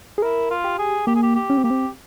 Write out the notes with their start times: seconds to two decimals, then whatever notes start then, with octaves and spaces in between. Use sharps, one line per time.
0.18 G#4
0.22 E4 A#4
0.50 F4
0.64 G4
0.79 G#4
1.07 A#3 G4
1.15 G#4
1.23 G4
1.35 G4
1.50 C#4
1.57 C4
1.64 A#3 G4
1.70 C4